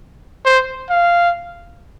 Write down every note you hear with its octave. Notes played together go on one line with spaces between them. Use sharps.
C5
F5